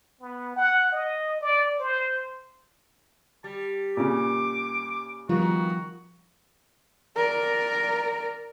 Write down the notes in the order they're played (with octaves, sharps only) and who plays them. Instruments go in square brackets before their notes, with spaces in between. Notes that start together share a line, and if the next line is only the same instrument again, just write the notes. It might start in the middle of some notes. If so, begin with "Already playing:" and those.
[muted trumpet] B3
F#5
D#5
D5
C5
[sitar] G3 [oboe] A5
[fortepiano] A#2 C#3 [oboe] D6
[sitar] D#3 B3 [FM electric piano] F3 G3 F4 [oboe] F#4
[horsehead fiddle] A#4 D5